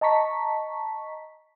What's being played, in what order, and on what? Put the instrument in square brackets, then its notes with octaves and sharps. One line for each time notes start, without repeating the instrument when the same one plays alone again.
[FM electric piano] D#5 A5 A#5 C#6 B6